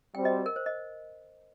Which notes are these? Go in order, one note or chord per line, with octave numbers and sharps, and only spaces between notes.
G3 C4 F#4 C5 G5
D#5
A#4
C5
D#5